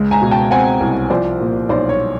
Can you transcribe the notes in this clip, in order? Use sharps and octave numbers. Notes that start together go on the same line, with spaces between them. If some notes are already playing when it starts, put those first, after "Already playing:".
Already playing: C#2 G#3
G#5 A#5
B2
G5 A5
C4 F#5 G#5
C2
F3 C5 D5
A#2
B1 C5 D5
C#5